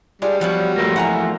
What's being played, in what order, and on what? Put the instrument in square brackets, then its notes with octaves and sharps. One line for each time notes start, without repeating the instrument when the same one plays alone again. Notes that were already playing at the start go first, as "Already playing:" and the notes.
[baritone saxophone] G3 [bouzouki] G#3 D4 F4
[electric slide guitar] F3 [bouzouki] F#3 B3 F#4
[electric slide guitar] F3 A3 A#3
[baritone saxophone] E3 [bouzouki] F#5 A5 A#5